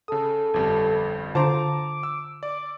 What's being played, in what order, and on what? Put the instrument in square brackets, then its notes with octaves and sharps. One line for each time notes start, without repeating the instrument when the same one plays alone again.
[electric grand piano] C#3 D#6 [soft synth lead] A4
[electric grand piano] G1 F2 G3
[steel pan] D3 F4 C5 [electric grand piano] A5 A#5 [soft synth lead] D6
[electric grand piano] E6
[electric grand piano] D5 [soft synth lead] D6